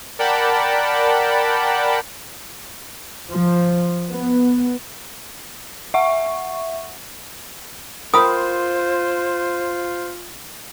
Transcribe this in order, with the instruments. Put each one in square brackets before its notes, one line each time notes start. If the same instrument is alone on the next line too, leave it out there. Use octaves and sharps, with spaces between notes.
[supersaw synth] A#4 D5 F#5 G5 A5 B5
[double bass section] F3
B3
[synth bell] E5 F#5 C#6
[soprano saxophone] F4 [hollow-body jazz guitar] A#4 G5 B5 [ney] C5 [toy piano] D#6